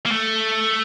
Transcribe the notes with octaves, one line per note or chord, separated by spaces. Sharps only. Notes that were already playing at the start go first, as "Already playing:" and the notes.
A#3
A3